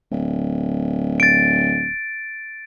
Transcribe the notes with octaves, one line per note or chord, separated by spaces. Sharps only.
D1
A6 D7